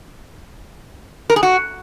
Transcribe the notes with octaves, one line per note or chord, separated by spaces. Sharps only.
A#4
G#4
F#4